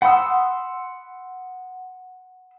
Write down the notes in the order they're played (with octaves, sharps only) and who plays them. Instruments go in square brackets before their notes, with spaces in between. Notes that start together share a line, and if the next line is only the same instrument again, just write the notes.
[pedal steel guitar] F#5 B5 C6 D#6 E6